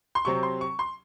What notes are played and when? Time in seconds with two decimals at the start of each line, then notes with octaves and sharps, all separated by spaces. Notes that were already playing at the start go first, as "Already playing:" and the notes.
0.15 C6
0.25 C3 F#3 C4 C#6
0.43 C6
0.61 C#6
0.79 C6